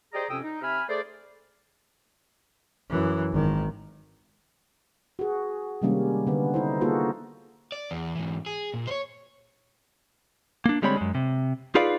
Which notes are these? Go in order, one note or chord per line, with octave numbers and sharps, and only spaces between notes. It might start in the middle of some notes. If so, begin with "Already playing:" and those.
G4 G#4 C5 D5 D#5 A#5
F2 C3 C#4 G5 D#6 E6
D#4
C3 E5 G#5 B5 F6
A3 G#4 C5 D5
F#2 E3
G#1 D#3
F#4 G#4
C3 D#3 G3 G#3 A#3 C#4
D3 B3
D#4 E4 C5
A#3 D#4 F4 F#4 G#4 A4
D5
E2
G#2 E3
G#4
A#2
C5 C#5
A#3 D4
D3 G3 G#3 C4 C#5 B5
F#2 G#3
C3
D#4 F4 G#4 B4 D5 F5